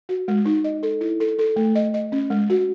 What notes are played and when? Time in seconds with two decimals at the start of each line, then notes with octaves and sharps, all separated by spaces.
0.09 F#4
0.28 G#3
0.46 D#4
0.64 D#5
0.83 A4
1.01 E4
1.20 A4
1.39 A4
1.56 A3
1.75 D#5
1.94 D#5
2.12 C#4
2.30 G#3
2.50 F#4